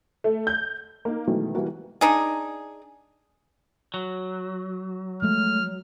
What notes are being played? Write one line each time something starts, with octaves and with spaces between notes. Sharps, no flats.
A3
G6
A#3 D#4
B2 D#3 E3 F#3 G#3 A3
E3 G3 A#3 F#4
D4 D#4 G#4
F#3
F3 G#3 A3 F6